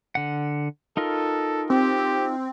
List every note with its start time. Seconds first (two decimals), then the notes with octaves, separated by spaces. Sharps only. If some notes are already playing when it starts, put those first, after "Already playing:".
0.15 D3 F#5
0.97 D#4 F4 A4 A#4
1.70 C4 G4